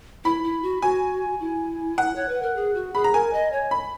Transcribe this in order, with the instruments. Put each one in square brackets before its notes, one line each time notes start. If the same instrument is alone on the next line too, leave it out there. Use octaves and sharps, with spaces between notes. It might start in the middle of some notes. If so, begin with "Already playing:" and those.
[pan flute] E4 [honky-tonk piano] B5
[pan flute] E4
F#4
[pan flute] F#4 [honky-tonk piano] G#5
[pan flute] E4
[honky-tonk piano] F#5
[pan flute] C#5
B4
A#4
G#4
F#4
[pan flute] G#4 [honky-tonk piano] B5
[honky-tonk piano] A#5
[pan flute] A#4 [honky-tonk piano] G#5
[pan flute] D#5
C#5
[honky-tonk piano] B5